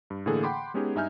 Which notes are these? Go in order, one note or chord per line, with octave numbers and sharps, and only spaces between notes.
G2
A2 D3 E3 A#3 G#4 A4
F#5 G5 B5 C6 D6
G#3 B3 C#4 D#4 G4 G#4
G2 D#4 E5 G#5 F6 G6